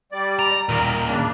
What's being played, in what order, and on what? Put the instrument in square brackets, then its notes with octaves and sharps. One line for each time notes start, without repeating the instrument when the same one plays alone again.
[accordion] G3 D5
[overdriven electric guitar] A#5
[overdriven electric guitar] D#2 A#2 [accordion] A#4
[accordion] C#3 D4